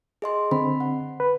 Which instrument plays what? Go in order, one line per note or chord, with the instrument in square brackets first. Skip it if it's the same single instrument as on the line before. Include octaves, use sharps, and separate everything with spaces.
[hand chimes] G#4 D#5 C6
[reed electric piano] D3 C4 [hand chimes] B5
[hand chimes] F#5
[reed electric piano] B4